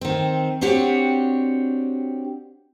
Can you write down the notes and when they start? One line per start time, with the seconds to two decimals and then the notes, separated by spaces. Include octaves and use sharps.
0.01 D#3 C4
0.61 C4 D4 F#4 G4 C#5